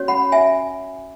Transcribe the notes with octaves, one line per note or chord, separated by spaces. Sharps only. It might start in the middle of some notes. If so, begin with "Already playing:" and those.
Already playing: C#4 F#4 C#5
F#5 B5
E5 G#5